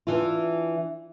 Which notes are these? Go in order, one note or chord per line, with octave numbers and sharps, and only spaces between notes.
E3 D4 F4